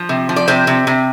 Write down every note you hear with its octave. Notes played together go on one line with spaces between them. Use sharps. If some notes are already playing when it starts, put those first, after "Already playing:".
Already playing: F3
C3
F3
D5
C3 C5
C3
C3